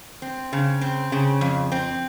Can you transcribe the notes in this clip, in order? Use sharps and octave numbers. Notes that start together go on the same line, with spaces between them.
C4
C#3
C4
C#3
F2
C4